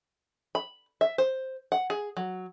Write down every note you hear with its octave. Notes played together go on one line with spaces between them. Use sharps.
B5
E5
C5
F#5
G#4
F#3